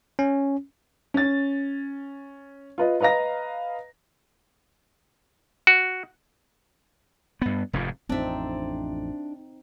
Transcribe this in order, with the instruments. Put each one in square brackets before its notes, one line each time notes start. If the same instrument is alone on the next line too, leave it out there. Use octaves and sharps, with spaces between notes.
[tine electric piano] C#4
[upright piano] C#4 A6
F4 B4 D#5
B4 D#5 F5 A#5 A#6
[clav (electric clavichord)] F#4
[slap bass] G2 B3
F1 F2 G#2
[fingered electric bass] A1 F2 [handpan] C4 D#4 [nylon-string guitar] D4 E5